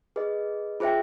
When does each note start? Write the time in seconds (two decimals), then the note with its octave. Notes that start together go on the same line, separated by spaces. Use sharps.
0.16 G#4 B4 D#5
0.80 F4 G#4 C5 E5 G5